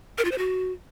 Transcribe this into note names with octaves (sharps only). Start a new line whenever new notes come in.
A#4
F4
C5
F#4